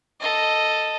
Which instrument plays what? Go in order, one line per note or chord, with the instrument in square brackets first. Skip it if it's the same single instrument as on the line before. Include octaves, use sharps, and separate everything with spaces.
[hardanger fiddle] A4 D#5